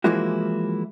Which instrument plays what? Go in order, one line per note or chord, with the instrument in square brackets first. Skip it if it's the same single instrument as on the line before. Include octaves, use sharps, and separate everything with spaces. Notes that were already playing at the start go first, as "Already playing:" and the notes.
[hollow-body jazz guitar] E3 F3 G#3 A#3 E4 F#4